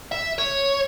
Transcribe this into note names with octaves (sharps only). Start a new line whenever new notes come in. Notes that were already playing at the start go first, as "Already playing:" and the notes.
E5
C#5